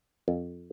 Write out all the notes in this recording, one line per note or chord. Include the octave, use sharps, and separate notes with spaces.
F2